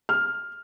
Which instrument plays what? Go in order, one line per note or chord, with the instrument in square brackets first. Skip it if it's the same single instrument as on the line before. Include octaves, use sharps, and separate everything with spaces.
[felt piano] F6